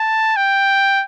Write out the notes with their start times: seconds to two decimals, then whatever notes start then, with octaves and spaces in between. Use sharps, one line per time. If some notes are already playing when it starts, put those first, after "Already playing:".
Already playing: A5
0.37 G5